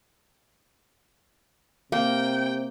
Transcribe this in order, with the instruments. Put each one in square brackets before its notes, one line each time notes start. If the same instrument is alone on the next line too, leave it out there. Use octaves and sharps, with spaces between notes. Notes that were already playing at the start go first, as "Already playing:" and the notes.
[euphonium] C3 [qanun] A#3 [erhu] G5